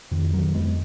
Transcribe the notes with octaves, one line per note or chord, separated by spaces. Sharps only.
F2 D#3
D#3 F#3
F2 G#3 B3